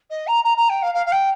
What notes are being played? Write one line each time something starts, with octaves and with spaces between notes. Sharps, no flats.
D#5
A#5
A#5
A#5
G5
F5
F5
F5
G5